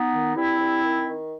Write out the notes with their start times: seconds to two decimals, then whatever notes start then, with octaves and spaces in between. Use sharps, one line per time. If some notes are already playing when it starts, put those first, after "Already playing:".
Already playing: B3 D#4
0.13 D#3
0.36 G2 C4 E4
0.59 G2
0.83 D#3
1.06 D#3